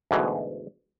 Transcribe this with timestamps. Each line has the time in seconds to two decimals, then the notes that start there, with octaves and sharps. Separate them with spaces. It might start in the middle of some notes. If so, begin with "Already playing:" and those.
0.11 D2 G#2 B2 E3